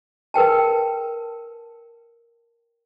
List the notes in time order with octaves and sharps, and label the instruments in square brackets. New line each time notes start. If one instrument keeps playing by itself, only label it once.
[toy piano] A#4 B4 G5 A5